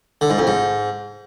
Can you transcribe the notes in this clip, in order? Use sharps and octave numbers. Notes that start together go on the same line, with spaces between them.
D3
G#2
F2
G#2